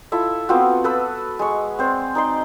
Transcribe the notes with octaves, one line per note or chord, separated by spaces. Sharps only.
E4 F4 A4 E5
B3 C4 F4 F#4
A4 B4 E6
G#3 C#6
C4 C5 D5
D#4 D5 C6